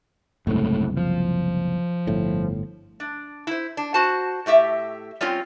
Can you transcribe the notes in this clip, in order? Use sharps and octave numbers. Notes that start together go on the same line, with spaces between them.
F#1 C2 G#2 A3
F3
G1 A2
D4
E4 C5
D4
F#4 C5 A5
A2 A3 G4 E5
G3 C4 C#4 F4